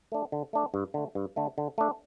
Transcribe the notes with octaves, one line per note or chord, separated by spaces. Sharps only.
A3 D4
D3
A3 D4
G2
D3 A3
G2
D3 A3
D3
A3 D4